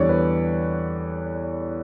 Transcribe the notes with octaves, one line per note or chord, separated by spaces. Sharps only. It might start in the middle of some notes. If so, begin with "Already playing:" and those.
Already playing: E2 D3 G3 C#5 D5
B4